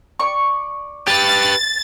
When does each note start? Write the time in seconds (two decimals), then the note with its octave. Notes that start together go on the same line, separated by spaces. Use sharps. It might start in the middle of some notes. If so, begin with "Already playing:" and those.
0.19 D5 C#6
1.07 G4 B4 A6